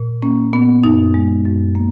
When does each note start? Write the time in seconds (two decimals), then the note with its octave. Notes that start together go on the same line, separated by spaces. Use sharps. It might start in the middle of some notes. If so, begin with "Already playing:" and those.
Already playing: A#2
0.22 A#3 C#4
0.53 A#2 B3
0.84 F#2 D#4
1.14 G#3
1.45 F#2
1.75 A#3